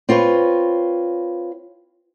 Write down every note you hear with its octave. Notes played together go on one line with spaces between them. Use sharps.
C4 F4 B4 C#5